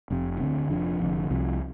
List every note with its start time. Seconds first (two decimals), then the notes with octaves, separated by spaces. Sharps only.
0.10 F1 F2 C3
0.40 D2 D3 F3 C4
0.70 F1 F2 F3 D4
1.00 F1 F2 D3
1.30 C2 C3 F3